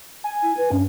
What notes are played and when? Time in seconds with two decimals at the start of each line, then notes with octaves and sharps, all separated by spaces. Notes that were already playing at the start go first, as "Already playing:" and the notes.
0.24 G#5
0.43 E4
0.57 B4
0.72 G2 C#4